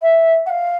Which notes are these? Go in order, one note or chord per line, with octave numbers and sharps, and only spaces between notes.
E5
F#5
F5